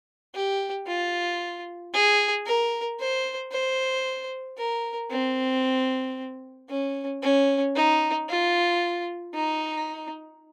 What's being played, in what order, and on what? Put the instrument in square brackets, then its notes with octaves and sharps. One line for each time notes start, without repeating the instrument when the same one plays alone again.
[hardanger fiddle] G4
F4
G#4
A#4
C5
C5
A#4
C4
C#4
C#4
D#4
F4
D#4